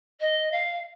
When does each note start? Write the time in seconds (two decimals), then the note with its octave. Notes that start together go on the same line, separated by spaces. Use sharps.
0.20 D#5
0.51 F5